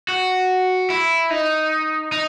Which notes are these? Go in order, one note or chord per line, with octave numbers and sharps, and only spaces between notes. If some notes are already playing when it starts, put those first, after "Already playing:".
F#4
E4
D#4
D#4